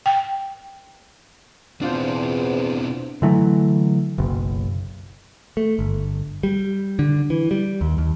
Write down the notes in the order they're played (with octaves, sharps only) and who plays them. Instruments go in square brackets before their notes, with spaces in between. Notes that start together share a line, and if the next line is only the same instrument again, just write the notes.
[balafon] G5
[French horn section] E2 [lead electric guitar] B2 C4 [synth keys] D4 F4 C5
[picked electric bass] D3 E3 F#3 A3
F#1 B1
A3
G1
G3
D3
E3
G3
D#2
D#2